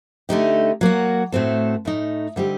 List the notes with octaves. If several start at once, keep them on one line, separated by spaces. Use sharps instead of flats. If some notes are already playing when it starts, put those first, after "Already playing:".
D3 A3 D#4 G4
F#3 A#3 F#4
A2 A3 C4 F#4 A4
A2 A3 D#4
D3 G3 C4 D#4 G4